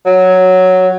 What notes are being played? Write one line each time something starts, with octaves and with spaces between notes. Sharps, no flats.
F#3